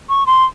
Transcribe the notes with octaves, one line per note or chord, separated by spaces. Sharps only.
C#6
C6